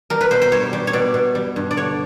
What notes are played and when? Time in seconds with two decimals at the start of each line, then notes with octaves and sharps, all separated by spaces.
0.10 G3 A#4
0.21 B4
0.31 B2 C5
0.42 C5
0.52 G3 C#5
0.73 G3
0.87 C#5
0.93 B2 D5
1.14 B2
1.35 G3
1.56 G2
1.71 D5
1.77 D3 C#5